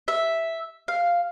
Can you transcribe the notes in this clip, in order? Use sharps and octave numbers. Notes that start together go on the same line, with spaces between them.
E5
F5